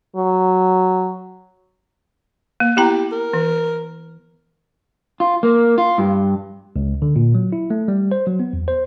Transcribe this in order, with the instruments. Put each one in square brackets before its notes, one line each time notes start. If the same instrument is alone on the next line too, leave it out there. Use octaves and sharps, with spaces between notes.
[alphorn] F#3
[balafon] A#3
[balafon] B3 E4 A#5 [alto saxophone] G4
[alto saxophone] A#4
[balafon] E3
[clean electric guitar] F4
A#3
F4
G2
[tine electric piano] C#2
D3
A#2
F#3
E4
A3
G3
C5
F#3
B3
E2
C5